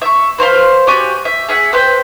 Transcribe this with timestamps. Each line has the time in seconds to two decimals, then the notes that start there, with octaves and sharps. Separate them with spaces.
0.02 E5 C#6
0.38 B4 C5 F5 C6
0.87 F#4 G4 D5 G#5
1.25 E5
1.48 G#4 E5 F#5
1.73 B4 C5 G5